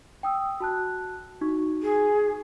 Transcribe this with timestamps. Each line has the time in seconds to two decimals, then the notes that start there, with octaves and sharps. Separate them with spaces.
0.23 G5 D#6 E6
0.60 F#4 A5 F#6
1.41 D#4 F#4 C#6
1.81 G#4